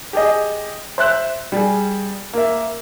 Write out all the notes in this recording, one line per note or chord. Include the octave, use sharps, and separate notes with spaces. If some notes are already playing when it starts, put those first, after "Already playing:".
G4 G#4 D#5
C5 E5 F#6
G3 G#4
A#3 E5